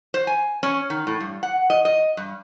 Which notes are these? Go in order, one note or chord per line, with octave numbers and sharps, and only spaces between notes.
C5
G#5
C#4
D#3
A2
G2
F#5
D#5
D#5
G2